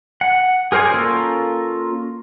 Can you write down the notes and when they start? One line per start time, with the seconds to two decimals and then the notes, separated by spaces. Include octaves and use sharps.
0.21 F#5
0.72 G#4 A#4 C5 D5 G#5
0.94 A#3 C#4 F4 A4 A#4